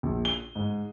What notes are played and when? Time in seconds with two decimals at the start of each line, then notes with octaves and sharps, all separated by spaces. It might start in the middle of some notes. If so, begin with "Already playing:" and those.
0.03 A#1
0.25 G7
0.55 G#2